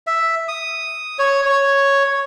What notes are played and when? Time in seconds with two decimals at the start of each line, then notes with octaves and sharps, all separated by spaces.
0.07 E5
0.48 D#6
1.19 C#5
1.45 C#5